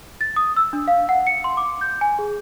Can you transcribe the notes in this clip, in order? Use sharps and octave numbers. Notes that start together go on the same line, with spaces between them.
A6
D#6
E6
D4
F5
F#5
C#7
C6
D6
G6
G#5
G#4